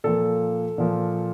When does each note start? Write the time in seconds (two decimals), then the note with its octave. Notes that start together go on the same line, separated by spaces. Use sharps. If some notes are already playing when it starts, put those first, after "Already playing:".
0.04 A#2 F3 A#3 A4
0.78 A#2 F3 A#3